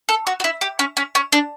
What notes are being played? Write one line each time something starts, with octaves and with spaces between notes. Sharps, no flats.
A4
F#4
F#4
E4
G4
C#4
C#4
C#4
D4